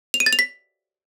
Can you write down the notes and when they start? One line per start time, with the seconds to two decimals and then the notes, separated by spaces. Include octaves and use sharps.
0.14 F7
0.20 D#7
0.26 A6
0.33 F7
0.39 B6